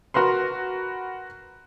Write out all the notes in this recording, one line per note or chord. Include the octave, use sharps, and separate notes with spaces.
F#4 A#4 B4 C6